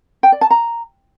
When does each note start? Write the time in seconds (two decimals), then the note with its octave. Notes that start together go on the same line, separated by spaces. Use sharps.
0.23 G5
0.32 D5
0.41 A5
0.51 A#5